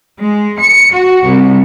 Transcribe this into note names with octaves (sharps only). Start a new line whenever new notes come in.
G#3
C#7
F#4
C2